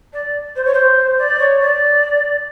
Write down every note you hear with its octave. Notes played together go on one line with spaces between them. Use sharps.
D5
C5
C#5
C5
D5
C#5
D5